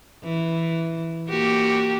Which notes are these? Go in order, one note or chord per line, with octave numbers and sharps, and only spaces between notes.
E3
A#3 F#4 G4